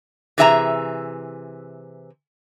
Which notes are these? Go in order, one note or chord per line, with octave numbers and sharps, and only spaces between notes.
C3 E3 G#4 E5 G#5 A#5